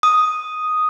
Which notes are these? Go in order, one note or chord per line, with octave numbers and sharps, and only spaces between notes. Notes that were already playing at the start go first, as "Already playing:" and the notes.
D#6